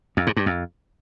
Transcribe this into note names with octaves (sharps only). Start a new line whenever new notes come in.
F2
G#2
G2
F2